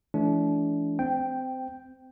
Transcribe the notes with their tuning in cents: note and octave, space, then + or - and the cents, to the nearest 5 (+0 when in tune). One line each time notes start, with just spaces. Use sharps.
E3 +20 A3 -40 D4 -35
C4 -20 G5 +0